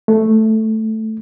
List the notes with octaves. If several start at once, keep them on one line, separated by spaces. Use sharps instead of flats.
A3